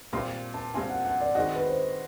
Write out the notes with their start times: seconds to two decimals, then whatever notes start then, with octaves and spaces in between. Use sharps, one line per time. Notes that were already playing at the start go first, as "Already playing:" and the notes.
0.13 A#2 G3 C4 F4 C6
0.54 A5
0.74 A#2 G3 C4 F4 G#5
0.89 F#5
1.05 F#5
1.20 D5
1.35 D#3 G#3 C4 D#4 F#4 D#5
1.55 B4
1.67 C5